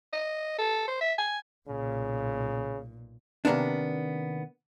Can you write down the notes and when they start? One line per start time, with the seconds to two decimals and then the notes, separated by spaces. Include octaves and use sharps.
0.13 D#5
0.58 A4
0.88 C5
1.01 E5
1.18 G#5
1.68 B1 A#2 C#3
3.45 C3 D#3 A#3 B3 D4